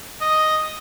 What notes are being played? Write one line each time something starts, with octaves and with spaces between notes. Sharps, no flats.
D#5